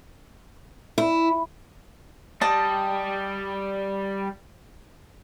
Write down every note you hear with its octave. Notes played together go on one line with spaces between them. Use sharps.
E4
G3 D#5 A5